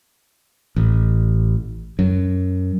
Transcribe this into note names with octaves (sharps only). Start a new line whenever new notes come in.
A1
F#2